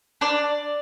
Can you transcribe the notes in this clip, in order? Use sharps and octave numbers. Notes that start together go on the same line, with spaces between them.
D4 D5